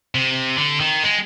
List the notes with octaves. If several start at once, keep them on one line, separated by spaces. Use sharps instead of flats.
C3
D3
D#3
G#3